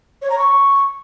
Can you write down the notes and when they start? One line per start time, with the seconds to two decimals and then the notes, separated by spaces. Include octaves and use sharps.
0.22 C#5
0.30 A#5
0.38 C#6